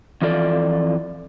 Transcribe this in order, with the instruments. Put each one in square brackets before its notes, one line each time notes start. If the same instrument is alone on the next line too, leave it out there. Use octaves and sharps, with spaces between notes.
[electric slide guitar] F2 E3 F4 A4 D5